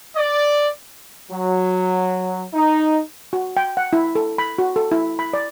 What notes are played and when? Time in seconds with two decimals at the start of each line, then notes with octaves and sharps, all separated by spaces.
0.17 D5
1.31 F#3
2.54 D#4
3.33 F#4
3.57 G5
3.77 F#5
3.93 E4
4.15 A4
4.38 B5
4.58 F#4
4.76 A4
4.92 E4
5.19 B5
5.33 D5